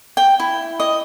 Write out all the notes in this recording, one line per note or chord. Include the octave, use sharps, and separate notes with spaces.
G5
E4
D#5